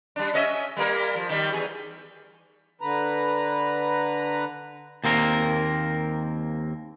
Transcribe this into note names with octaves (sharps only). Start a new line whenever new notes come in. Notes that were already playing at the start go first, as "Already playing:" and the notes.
G3 D4
C#4 D#5 E5
G3 A#3 A#4
F3
D#3 G3
E2 G#4
D3 B4 A#5
D#2 A#3 C4 A#4